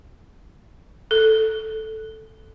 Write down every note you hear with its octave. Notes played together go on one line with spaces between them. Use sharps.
A4